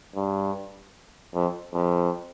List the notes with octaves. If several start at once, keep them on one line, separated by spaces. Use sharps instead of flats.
G2
F2
F2